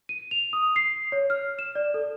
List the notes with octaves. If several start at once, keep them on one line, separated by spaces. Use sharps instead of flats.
D#7
F7
D#6
C7
C#5
F6
E7
D5
A4